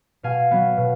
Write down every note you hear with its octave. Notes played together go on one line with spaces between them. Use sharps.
B2 F5 G#5
F#3 B3
B2